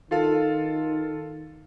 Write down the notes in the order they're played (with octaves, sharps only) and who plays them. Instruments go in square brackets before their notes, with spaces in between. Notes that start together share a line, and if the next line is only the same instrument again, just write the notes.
[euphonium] D#3 [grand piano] F4 A4 F5